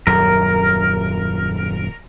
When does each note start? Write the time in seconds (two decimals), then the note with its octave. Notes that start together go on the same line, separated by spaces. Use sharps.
0.07 D#1 F#2 F#3 A#4